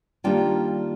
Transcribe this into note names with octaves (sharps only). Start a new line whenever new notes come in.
D#3 G3 A#3 D4 F4 G5